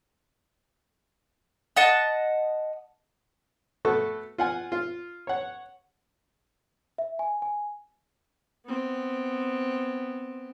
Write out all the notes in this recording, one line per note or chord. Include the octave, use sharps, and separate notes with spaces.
D#5 F#5 A5
A3 B3 F#4 A4 C#6
F4 F#5 G#5
F4
C#5 F#5
E5
G#5
G#5
B3 C4